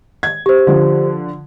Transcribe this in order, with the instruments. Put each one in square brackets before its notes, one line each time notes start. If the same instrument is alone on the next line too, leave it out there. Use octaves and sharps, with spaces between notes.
[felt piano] G#6
[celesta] G4 C5
[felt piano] D3 F3